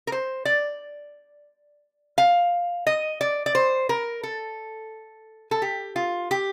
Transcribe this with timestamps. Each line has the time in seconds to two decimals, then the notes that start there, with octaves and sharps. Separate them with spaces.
0.07 A#4
0.12 C5
0.45 D5
2.18 F5
2.87 D#5
3.21 D5
3.46 D5
3.55 C5
3.89 A#4
4.23 A4
5.51 A4
5.62 G4
5.96 F4
6.31 G4